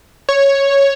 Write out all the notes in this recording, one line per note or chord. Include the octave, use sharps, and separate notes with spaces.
C#5